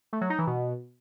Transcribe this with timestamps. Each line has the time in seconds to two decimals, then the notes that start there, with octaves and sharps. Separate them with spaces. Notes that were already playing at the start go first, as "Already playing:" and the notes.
0.13 A3
0.21 F#3
0.30 D#4
0.38 E3
0.47 B2